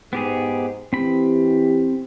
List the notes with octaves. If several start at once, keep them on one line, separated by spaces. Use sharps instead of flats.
G#2 B3 G4 G#4
E3 C4 G4 B5